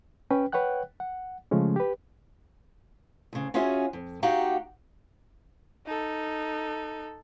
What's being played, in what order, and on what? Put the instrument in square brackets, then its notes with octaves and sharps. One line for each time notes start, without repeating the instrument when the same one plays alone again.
[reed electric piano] C#4 B4 G5
B4 C#5 F#5 G5 F#6
F#5
C#3 F3 G#3 A3 C#4
G4 B4
[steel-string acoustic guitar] D2 C#3
C#4 F4 F#4 G#4 C#5 E5
F2
A#3 D#4 F#4 G4 F5 F#5
[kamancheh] D#4 A4